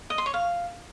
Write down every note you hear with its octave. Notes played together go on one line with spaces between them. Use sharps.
D#5
C6
C#5
F5